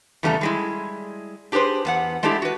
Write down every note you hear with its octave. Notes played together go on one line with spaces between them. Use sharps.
E2 C#3 G3 A3 A5 A#5
G3 G#3 E4
D4 G4 G#4 B4 C5
E2 B3 F#5
G#3 A3 D4 E4 G4
F#4 B4